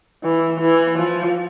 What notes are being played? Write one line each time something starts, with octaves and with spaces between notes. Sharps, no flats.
E3
E3
F3